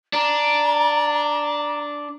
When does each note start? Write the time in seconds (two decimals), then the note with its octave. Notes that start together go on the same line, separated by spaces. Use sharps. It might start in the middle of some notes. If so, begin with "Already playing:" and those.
0.13 D4 A#5